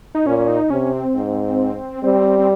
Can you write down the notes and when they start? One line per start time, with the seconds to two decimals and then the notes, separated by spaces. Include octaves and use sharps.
0.15 D#4
0.27 A#2 C#4
0.48 D#4
0.70 C3 C#4
0.93 C4
1.15 G#2
2.04 G3 C4
2.39 C4